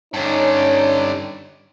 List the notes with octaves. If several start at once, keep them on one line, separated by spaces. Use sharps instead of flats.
G2 D3 C#4 D#4 C#5